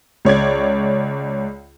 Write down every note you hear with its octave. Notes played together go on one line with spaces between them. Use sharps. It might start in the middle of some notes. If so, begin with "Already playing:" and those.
C#2 C#5 D5 G#6